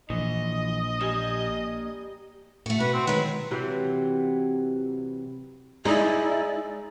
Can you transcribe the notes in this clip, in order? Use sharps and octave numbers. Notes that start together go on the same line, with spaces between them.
A#1 E3 D#5
G3 A#3 G#5
A2 A3 F#4
B2 F#4 B4
C4
D#3 F#3 G#3 B4
C3 E3 F#3
G#3 D#4 E4 D5